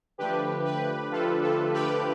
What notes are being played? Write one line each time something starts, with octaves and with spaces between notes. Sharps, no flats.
D3 F3 A3 D4 G4 B4
G4 B4
F4 A4
F4 A4
G4 B4